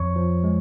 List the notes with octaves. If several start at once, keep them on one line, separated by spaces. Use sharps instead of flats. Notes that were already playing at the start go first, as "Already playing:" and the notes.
Already playing: F2 F3 C#5 C#6
F3
G#3